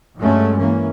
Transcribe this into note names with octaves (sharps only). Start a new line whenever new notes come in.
G2 F#3 G#3 A3 C#4
E3 A#3 C#4